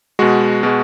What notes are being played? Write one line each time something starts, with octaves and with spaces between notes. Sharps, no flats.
B2 G#3 F#4
B2 G#3